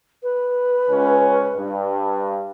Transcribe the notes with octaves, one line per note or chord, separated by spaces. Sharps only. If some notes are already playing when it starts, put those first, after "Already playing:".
B4
C#2 C#4
G2